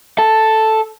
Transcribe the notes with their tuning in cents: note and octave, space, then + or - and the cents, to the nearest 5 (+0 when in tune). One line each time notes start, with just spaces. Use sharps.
A4 +0 A5 +0